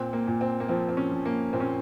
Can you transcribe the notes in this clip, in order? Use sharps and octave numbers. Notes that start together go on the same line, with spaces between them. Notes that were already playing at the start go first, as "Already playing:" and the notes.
Already playing: A#2 C4
A#3
A#2
C4
A#3
F3 C4
C4
C#4
F3
A#3
A#2 C4
C#4